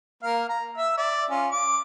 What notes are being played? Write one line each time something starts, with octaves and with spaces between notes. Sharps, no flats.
A#3 A#4 F5
A#5
E5 E6
D5 E5
C#4 F4
D6